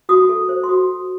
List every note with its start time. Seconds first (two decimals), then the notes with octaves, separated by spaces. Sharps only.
0.09 F#4 D#6
0.29 A4
0.49 C5
0.64 C6
0.69 F#4 D#6